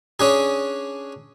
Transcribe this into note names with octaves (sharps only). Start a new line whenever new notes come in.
C#4 D4 G#4